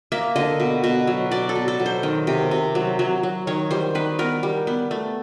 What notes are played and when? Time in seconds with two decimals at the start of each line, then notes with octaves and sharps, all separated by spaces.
0.12 A#3 E5
0.36 D3 D#5
0.60 B2
0.84 B2
1.07 F#3
1.31 B2 D5
1.49 A4
1.55 B2
1.68 A4
1.80 F#3
1.86 C5
2.03 D#3
2.27 C3
2.51 C3
2.75 F#3
2.99 F#3
3.23 F#3
3.47 D#3 C#5
3.71 G3 C5
3.95 D#3 B4
4.19 B3 A#4
4.43 G3
4.67 B3
4.91 A3